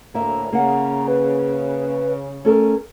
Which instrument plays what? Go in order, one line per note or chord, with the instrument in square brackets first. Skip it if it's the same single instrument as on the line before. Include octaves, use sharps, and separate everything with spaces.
[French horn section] D2 A2 [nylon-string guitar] A#3 E5 [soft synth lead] A#5
[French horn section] C#3 [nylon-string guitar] A#3 F#5
[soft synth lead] B4
[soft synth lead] A3 [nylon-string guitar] C#4 A4 A#4